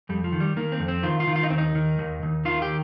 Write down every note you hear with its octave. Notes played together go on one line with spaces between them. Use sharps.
F2 G3
F3
D#3
G3
D#3 A#3
C4
F2
C4
D#3 F4
F4
D#3
F4
D#4
D#2 C4
D#4
D#3
D#2
D#2
D#3 F4
G4